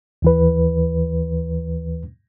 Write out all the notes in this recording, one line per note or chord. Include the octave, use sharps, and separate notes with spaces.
D#2 E3 B4